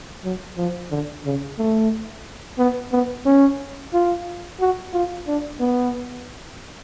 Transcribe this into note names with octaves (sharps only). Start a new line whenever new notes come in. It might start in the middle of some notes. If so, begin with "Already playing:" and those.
F#3
F3
D3
C#3
A3
B3
B3
C#4
F4
F#4
F4
D4
B3